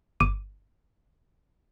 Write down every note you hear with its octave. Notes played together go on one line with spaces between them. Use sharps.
G1 D6 D#7